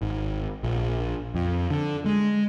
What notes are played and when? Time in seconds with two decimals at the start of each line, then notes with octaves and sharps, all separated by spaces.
0.02 G#1
0.63 A#1
1.35 F2
1.70 D3
2.06 G#3